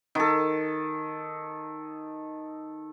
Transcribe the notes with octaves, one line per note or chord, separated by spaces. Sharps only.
D#3 A4